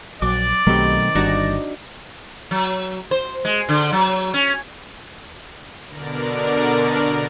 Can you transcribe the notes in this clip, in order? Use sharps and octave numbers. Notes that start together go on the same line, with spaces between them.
A#1 F#3 D5 D6
B1 B2 D#3 F#3 A3 C4 G4
G1 D#3 G3 D4 D#4 F#4 A#6
F#3
C5
G#3
D3
F#3
C#4
B2 D3 A#4 D5